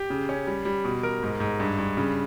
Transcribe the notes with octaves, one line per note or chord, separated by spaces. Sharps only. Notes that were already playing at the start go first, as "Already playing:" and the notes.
Already playing: G4
C#3
C#4
G3
G3
B2
A#4
G#2
G#2
G2
G2
C#3